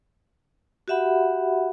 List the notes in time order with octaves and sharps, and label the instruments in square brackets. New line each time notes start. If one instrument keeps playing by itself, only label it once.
[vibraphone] F#4 G4 E5 F#5 B5